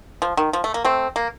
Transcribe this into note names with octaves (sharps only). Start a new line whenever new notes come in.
F3
D#3
F3
A3
A#3
A3 C4
A#3